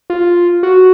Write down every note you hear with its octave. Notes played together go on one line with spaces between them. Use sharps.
F4
F#4